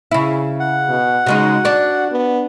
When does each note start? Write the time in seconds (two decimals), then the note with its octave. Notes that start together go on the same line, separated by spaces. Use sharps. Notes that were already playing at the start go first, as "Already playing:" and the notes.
0.11 C#3 E4
0.60 F#5
0.89 B2
1.26 C#3 G#3 D#4 F#4
1.65 D4 D5
2.12 B3